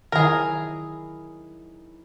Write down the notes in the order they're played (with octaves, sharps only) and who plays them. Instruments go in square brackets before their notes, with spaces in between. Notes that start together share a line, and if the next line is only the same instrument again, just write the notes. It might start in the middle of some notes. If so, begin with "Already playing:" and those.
[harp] D#3 F#3 E4 [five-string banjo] G#4 A#4